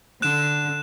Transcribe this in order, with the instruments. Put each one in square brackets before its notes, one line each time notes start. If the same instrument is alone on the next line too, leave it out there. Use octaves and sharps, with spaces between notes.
[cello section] D3 [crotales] F#6 E7